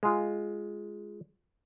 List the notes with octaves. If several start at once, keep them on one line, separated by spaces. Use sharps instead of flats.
G#3 F4